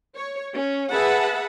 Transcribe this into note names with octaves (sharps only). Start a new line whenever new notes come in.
C#5
C#4
G#4 B4 E5 F#5 A5 B5